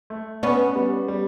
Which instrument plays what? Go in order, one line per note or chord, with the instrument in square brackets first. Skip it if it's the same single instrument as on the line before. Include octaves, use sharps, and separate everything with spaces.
[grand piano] A3
[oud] B3 C#4 [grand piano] D4
[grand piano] G3
G3